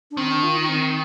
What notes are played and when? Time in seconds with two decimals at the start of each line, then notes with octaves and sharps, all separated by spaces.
0.11 D4
0.17 D#3 C4
0.31 D4
0.43 F4
0.57 D#4
0.69 C4